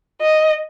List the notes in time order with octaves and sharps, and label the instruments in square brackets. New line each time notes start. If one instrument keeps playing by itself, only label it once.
[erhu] D#5